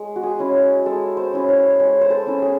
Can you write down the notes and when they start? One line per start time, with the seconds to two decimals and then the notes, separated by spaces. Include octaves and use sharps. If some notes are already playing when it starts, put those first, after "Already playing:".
Already playing: G#3
0.16 F#4
0.23 G#4
0.39 C#4 E4
0.86 G#3 A4
1.17 C5
1.33 C#4 E4
1.49 C#5
1.80 G#3 C#5
2.01 C5
2.10 A4
2.26 C#4 E4
2.42 G#4